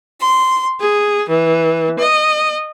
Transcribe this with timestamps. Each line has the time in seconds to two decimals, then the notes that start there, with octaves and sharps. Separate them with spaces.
0.21 C6
0.80 G#4
1.28 E3
1.98 D#5